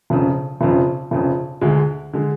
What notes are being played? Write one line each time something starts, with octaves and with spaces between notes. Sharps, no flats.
F1 F2 C#3
F1 F2 C#3
F1 F2 C#3
D2 D3 G#3
D3 G#3